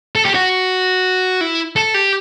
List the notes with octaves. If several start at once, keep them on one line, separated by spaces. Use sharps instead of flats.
A4
G4
F#4
E4
A4
G4